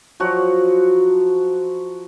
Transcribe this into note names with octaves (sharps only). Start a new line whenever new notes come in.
F3 F#3 F#4